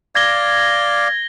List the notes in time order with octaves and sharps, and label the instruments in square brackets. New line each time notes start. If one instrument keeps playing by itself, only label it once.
[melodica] D5 F5 [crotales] G#6 A#6 G7